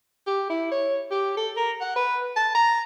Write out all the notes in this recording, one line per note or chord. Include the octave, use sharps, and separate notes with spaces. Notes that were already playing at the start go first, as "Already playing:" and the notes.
G4
E4
C#5
G4
A4
A#4
F#5
B4
A5
A#5